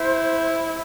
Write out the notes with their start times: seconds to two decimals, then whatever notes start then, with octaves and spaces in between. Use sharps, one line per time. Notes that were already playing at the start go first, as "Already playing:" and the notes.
Already playing: E4 C5